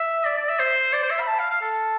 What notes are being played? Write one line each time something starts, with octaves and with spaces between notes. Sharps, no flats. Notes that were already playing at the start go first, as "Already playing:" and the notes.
Already playing: E5
D5
D5
E5
C5
D5
C5
E5
B5
A5
F5
F5
A4